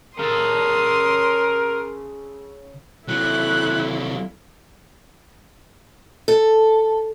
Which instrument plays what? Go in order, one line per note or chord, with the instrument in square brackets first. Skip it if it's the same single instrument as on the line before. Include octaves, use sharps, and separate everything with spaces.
[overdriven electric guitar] C#3 A4 [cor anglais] A#4 [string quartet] C6 D#6
[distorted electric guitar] C3 F#3 [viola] E4 A4 [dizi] F#6
[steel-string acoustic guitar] A4